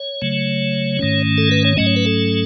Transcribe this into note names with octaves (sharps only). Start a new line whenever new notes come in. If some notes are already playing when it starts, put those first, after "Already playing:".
Already playing: C#5
C#3 F#3 A3
G#2 D#3 A3 C#4
A4
B4
C#5
G#2 F#3 A3 C#4 D#5
C#5
B4
A4